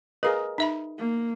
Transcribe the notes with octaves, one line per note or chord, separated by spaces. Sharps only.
G#4 A#4 B4 D#5 F5
D#4 E5 B5
A#3